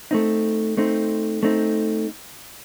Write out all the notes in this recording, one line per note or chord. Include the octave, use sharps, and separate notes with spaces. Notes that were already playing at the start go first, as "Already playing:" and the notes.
A3 C4 D#4
A3 C4 D#4
A3 C4 D#4